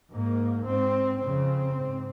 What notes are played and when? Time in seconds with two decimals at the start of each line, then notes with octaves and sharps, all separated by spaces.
0.15 G#2 A#3
0.68 G#2 C4
1.21 F2 C#3 C4
1.74 G#2